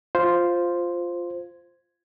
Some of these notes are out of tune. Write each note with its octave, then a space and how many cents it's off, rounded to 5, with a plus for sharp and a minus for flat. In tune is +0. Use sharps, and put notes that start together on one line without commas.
F4 +0 C5 +0